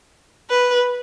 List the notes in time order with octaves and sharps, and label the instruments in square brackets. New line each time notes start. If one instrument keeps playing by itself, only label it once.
[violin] B4